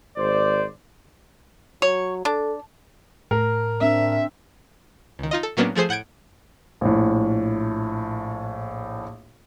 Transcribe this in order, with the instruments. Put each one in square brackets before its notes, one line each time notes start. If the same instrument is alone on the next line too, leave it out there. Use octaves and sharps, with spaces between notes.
[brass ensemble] G#1 C5 D5
[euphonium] F#3 [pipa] C#5
[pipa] D4 [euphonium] A4
[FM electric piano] A2 [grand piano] A#4
[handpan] C4 D4 [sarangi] E5
[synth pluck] C#2 D#3
D#4 F4 D#5
A4
A2 F#3 A#3 B3 C#4 D4
F3 A3 G#4 C5 C7
A2 F#5 G6 G#6 D7
[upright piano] A#1 A2